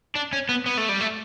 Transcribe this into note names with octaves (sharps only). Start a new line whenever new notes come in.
D4
C#4
B3
B3
A3
G3
A3